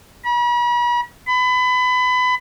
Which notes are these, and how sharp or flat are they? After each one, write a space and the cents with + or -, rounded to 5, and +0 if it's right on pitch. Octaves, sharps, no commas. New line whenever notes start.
B5 -45
B5 +25